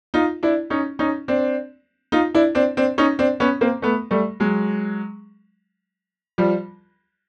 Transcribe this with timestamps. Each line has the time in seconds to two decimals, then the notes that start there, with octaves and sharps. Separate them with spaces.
0.14 D#4 F4
0.43 D4 E4
0.70 C#4 D#4
0.99 C#4 D#4
1.28 C4 D4
2.12 D#4 F4
2.34 D4 E4
2.55 C4 D4
2.77 C4 D4
2.98 C#4 D#4
3.19 C4 D4
3.40 B3 C#4
3.61 A#3 C4
3.82 A3 B3
4.11 G3 A3
4.40 F#3 G#3
6.38 F3 G3